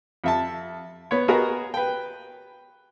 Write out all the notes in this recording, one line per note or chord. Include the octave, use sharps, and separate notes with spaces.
F2 E5 A5
B3 C#5
B3 F#4 G#4 A#4 D#5
B4 G5